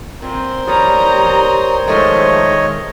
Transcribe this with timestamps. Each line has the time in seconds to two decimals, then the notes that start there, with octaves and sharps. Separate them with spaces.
0.22 A#2 C4 A#4 C5
0.67 G3 G4 C#5 A#5 D#6
1.88 D#3 F3 G#3 A3 C#5 D#5